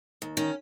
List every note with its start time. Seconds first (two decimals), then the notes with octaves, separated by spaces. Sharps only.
0.22 D#2
0.37 D#3 C#4